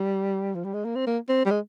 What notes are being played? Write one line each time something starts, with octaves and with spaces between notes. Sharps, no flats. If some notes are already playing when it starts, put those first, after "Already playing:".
Already playing: G3
F3
G3
G#3
A#3
C4
A#3
C4
G3
G#3